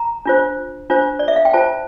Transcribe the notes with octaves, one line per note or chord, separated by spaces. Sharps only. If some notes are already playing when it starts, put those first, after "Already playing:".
Already playing: A#5
D4 F4 C5
D4 F4 C5
D5
E5
F5
G5
F4 C5 A5